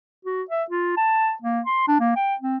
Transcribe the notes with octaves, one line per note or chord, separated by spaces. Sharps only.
F#4
E5
F4
A5
A#3
C6
D4
A#3
G5
C4